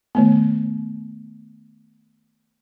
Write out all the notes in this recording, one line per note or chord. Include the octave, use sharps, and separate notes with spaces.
D#3 A3 B3